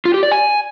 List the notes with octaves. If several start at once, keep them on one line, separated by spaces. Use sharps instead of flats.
F4
G4
D5
G#5